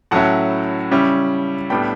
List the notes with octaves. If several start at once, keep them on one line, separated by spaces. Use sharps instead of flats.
A2 F#3 C#4 E4 F#5 A5
C#3 G3 C#4 E4
A2 G3 B3 D4 G5 B5